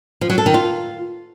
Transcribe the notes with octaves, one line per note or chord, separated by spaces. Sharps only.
F3
F#3
A4
D#3
F4